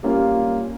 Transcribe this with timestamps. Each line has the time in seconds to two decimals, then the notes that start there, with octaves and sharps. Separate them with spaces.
0.03 G3 A#3 C#4 F4